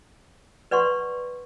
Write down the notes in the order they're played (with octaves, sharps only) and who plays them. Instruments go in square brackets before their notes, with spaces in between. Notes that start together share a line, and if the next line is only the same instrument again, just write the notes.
[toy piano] B4 D5 F#5 C6 C#6